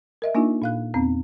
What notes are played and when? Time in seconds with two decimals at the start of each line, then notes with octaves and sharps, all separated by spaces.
0.22 A#4 D#5 E5
0.35 A#3 D4 D#4 F4
0.62 A#2 F5 F#6
0.94 E2 B3 C4